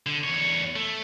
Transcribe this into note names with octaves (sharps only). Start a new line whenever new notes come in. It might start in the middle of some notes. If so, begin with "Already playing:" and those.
D3
E2 C#5
A3